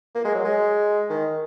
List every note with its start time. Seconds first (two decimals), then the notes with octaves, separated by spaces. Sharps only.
0.15 A#3
0.25 G#3
0.34 F#3
0.44 G#3
1.10 D#3